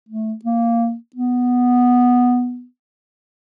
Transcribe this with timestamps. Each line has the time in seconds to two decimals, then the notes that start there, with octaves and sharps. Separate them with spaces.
0.09 A3
0.45 A#3
1.16 B3